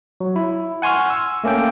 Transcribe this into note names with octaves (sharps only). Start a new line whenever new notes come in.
F#3
E4
F#5 G#5 C6 C#6 F6
E6
A3 A#3 C#4 A4 G5